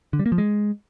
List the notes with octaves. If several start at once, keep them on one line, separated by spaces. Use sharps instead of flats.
D3
G3
A#3
F3
G#3